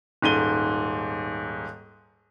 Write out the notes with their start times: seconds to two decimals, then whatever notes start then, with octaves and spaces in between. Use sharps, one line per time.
0.22 D#1 G#2 D#7 G7